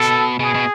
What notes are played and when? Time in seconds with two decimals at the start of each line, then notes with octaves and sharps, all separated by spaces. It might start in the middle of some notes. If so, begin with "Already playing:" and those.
Already playing: B2 A4
0.39 B2 G#4
0.55 B2